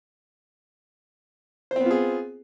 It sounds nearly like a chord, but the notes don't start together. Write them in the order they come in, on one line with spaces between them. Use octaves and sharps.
C5 C4 B3 F4 G#4